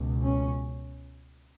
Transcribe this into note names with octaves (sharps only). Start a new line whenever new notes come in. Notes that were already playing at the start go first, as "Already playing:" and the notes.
Already playing: C#2 B2
C#4